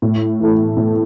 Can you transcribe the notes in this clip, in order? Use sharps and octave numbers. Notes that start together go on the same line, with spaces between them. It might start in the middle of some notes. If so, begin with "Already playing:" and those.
A2
E3 A3
A2